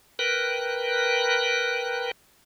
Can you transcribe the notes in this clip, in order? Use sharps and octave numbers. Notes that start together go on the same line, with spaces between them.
A#4 B4 G5 F#6